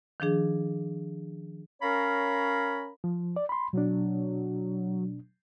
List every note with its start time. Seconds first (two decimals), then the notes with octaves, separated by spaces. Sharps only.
0.20 D#3 F3 D4 G#4
1.82 C#4 A#4 C#5 F5 A#5 B5
3.04 F3
3.36 D5
3.49 B5 C6
3.73 B2 F#3 D4